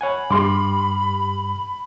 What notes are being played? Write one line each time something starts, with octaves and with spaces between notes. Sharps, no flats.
C#5 F#5 G#5 B5
G2 G4 C6 D6 F6